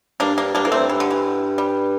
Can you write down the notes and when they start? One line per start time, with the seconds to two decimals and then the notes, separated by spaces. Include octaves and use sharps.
0.20 G2 A#3 D4
0.38 A#3 D4
0.54 G2 A#3 D4
0.65 A2 A#3
0.72 A3 C4
0.78 G2
0.89 E3
1.00 D3
1.11 E3
1.58 G3